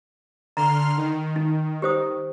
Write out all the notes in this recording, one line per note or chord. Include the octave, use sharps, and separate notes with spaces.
D3 A#5 C6 F6
D#3
D#4
G4 C5 D#6